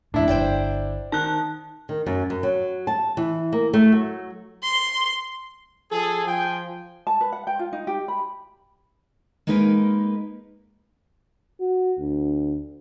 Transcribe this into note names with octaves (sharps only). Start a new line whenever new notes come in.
F2 A2 D4 E4
G1 C5 D5 G5
D#3 A5 F#6
D#3
F#2
F#2
F#3
A5
E3
A#3
A3
F#3
C6
F3 G#4 A4
F3 G5 G#5
A5
B4
F#5
G5
F4
D#4
G4
B5
G#3 A#3 D#4 A#4 B4
F#4
D2